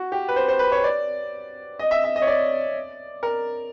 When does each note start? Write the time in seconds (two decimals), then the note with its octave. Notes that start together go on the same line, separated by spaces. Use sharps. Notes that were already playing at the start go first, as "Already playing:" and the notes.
Already playing: F#4
0.12 G4
0.28 B4
0.36 C5
0.48 C5
0.59 B4
0.72 C#5
0.84 D5
1.79 D#5
1.91 E5
2.04 E5
2.16 D#5
2.22 C#5
2.27 D5
3.23 A#4